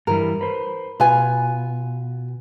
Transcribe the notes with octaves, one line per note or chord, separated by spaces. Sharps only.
G2 E3 G3 A#4
B4 C5
B2 F4 B4 G#5